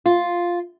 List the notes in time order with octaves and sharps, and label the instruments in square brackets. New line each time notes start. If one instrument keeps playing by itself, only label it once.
[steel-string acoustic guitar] F4